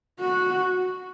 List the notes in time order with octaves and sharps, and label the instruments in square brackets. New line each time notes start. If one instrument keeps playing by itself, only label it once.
[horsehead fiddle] F#4